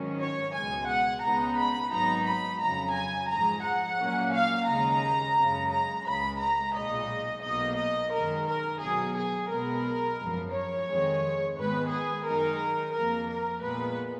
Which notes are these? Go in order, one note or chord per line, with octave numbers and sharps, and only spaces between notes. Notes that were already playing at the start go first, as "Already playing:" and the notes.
Already playing: G#1 G#2 D#3 F#3 C#4
C#5
C#2 B2 G#3 G#5
F#5
C#2 C#3 G#3 B3 D#4 A#5
B5
G#1 G#2 F#3 B3 D#4 A#5
B5
F2 C#3 F#3 A#5
G#5
G#2 F3 G#3 A#5
F#5
A#2 F#3 A#3 C#4
F5
D#2 C#3 G#3 D#4 A#5
F#2 C#3 G#3
A#5
C#2 C#3 G#3 B5
A#5
B1 A#2 G#3 D#4 D#5
B1 B2 A#3 D#4 D#5
D#5
F#2 D#3 G#3 A#4
A#4
B1 B2 F#3 G#4
G#4
B1 B2 G#3 B3 A#4
G#1 F#2 F3
C#5
F2 D#3 G#3
G#2 D#3 G#3 B3 B4
G#4
F#2 D#3 G#3 D#4 A#4
F2 F3 A#3 A#4
A#4
A#2 G#3 B3 B4